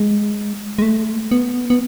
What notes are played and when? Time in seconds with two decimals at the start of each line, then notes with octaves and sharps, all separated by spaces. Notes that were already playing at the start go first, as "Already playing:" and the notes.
Already playing: G#3
0.78 G#3
0.82 A3
1.31 B3
1.70 B3